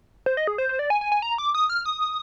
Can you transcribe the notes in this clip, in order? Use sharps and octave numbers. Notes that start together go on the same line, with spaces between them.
C5
D#5
G#4
C5
C5
D5
G#5
G#5
G#5
A#5
D6
D#6
F6
D#6